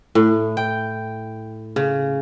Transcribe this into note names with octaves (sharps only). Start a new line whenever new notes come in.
A2
G5
C#3